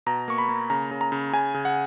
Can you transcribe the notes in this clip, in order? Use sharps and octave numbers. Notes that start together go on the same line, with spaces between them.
B2 A#5
A#3 C#6
B5
A#3
C#3 A#5
C#3
A#5
C#3
C#3 G#5
C#3
F#5